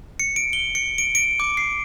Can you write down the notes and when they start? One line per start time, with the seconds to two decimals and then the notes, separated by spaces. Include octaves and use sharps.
0.20 C#7
0.36 D7
0.53 G7
0.75 C#7
0.98 D7
1.15 D7
1.40 D6
1.57 C7